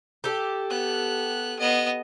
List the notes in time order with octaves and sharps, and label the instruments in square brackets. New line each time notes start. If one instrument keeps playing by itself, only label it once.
[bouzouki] G4 A4
[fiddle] B3 F#6
B3 D#5